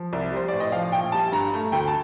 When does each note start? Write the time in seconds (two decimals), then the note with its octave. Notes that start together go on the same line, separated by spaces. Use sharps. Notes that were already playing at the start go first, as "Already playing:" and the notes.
Already playing: F3
0.13 C2 D5
0.32 G3 C5
0.48 A1 D5
0.60 D#5
0.72 F3 F5
0.92 A#1 G5
1.12 G3 A5
1.32 G2 A#5
1.53 A3
1.72 D2 G5
1.88 A5